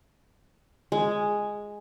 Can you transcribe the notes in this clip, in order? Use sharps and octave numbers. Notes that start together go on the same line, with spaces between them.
G#3